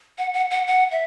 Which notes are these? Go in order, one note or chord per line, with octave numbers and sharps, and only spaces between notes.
F#5
F#5
F#5
F#5
E5